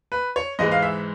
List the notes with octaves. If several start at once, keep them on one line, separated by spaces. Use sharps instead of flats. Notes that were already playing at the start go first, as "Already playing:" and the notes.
B4
C#5
G#2 E3 G#3 D#5
F5
E5